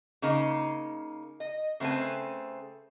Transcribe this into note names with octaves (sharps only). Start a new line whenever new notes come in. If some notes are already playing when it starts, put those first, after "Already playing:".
C#3 A#3 D#4
D#5
C#3 A3 C4 B4 G#5